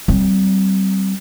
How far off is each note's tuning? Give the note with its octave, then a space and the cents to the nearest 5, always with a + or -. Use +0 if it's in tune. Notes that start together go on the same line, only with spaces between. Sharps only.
G3 -30 C4 +0